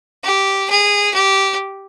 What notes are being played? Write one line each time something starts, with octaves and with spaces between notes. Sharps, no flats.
G4
G#4
G4